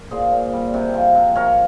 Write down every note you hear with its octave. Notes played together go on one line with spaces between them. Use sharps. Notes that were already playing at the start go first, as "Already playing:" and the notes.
Already playing: A#4
A#2 G#4 C5
A#2
G3
C3
F3
C3
F3 A#4 C#5